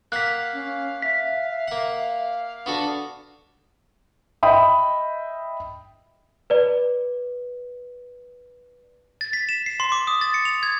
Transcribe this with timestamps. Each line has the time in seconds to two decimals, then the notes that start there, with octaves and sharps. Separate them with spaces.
0.12 A#3 F5 F#5 F#6 B6
0.53 C#4
1.02 E5 B6
1.68 A#3 F#5
2.66 B3 D4 F#4 A4
4.43 D#5 E5 G5 B5 D#6
6.50 B4 D5
9.21 A6
9.33 B6
9.49 E7
9.66 C7
9.80 C6
9.92 D6
10.07 D#6
10.21 A6
10.34 C#7
10.45 F7
10.63 G#6